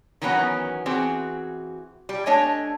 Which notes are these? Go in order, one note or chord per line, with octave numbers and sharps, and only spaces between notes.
D#3 E3 F#3 B3 C#4 F#5
E3 C4 F#4 G#4
G3
A3 D4 C#5 D#5 G#5